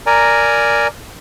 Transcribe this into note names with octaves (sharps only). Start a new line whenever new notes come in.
A#4 D5 G#5 A#5